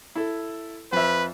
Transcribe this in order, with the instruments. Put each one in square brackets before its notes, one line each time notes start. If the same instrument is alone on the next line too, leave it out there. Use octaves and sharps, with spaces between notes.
[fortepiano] E4 A4
[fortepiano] F2 C5 E5 [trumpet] B4